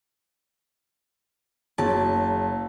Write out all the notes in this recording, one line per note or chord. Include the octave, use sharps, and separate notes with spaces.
F#1 F#3 A5